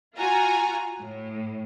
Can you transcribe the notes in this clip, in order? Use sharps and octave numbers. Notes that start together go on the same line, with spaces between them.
F4 F#4 G#5 A#5
A2